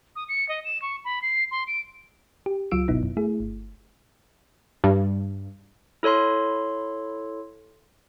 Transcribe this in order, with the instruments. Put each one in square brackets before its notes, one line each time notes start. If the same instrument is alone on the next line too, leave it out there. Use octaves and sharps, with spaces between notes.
[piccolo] D#6
C#7
D#5
E7
C#6
B5
C7
C6
D7
[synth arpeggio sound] G4
C#2 F#3 F4 E6 D7
G1 B2 B3 D#4 E4
F#2
A3 E4 G#4
G1
[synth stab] G2
[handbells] E4 A4 C#5 B5 C6